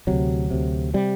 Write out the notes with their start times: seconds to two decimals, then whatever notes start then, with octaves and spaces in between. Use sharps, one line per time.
0.07 D2 C3 F#3
0.51 D2 C3
0.94 C3 G3